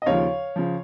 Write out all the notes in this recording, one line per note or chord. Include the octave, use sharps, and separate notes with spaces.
D#5
D#2 C#3 F3 C#5 F5
C#3 F3